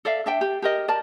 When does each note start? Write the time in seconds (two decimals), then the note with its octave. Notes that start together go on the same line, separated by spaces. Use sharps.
0.05 A4 D5 E5 F5
0.26 D4 E5 G5
0.41 G4
0.62 G4 A#4 D#5
0.88 A#4 D5 A5